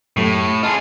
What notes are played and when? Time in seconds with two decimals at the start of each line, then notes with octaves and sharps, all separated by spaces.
0.17 F#2 A2 A3 G4
0.63 F4 G#4 D#5 A5 C6